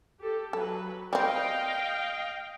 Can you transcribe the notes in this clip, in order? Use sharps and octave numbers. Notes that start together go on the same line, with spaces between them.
G4 A4
F#3 A4 B4
G3 C4 D#5 F5 G5